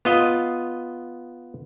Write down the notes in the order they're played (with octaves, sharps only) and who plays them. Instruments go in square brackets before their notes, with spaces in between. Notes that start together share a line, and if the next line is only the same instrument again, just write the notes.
[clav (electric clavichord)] B3 F4 D#5